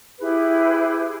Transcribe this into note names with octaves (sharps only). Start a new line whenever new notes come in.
E4 G4 G#4 B4